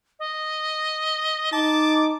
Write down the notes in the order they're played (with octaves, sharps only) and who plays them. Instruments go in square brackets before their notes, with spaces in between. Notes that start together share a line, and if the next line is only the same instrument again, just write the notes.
[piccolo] D#5
[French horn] D#4 [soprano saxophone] A5 [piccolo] D6